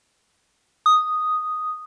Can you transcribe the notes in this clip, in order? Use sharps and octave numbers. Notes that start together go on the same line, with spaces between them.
D#6